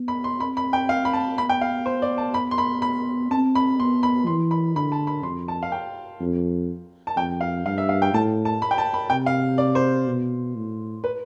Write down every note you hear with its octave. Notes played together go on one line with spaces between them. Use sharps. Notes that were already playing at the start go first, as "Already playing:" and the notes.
Already playing: B3
B5
C6
C4 B5
B5
G5
F5
B5
A5
B3 B5
G5
F5
C5
D5
A5
B5
C6
B5
B5
C4 A5
B5
B3 C6
B5
E3 C6
B5
D3 B5
A5
B5
F2 C6
A5
F5
G5
F2
A5
F2 G5
F5
G2 F5
E5
F5
G5
A2 A5
A5
B5
G5
A5
B5
C3 G5
F5
D5
C5
B2
A2
B4